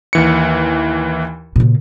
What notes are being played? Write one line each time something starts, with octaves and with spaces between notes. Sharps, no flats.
D#2 E3 C#7
A#2 C#3